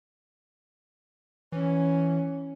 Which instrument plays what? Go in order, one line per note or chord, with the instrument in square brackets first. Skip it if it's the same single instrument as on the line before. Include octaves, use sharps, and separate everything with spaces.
[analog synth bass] E3 [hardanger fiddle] C#4